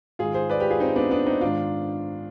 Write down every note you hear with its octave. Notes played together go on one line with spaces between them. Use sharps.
G#2 D#3 F4 G#4
G#4 C5
B4 D5
G4 B4
F4 G#4
C4 D#4
B3 D4
B3 D4
C4 D#4
G#2 D#3 D4 F4